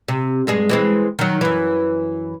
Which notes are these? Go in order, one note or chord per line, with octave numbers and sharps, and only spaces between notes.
C3
G2 G#3 G#4
E3 G#3 C4
D#3 F#3
F#2 E3